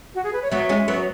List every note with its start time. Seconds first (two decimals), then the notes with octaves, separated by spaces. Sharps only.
0.15 F#4
0.24 G#4
0.33 B4
0.42 C#5
0.51 F#3 B3 E5
0.69 G#3 C#4
0.88 F#3 B3